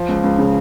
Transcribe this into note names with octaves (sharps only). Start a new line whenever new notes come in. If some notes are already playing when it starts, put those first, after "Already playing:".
Already playing: F3
C#2
C#2
C#3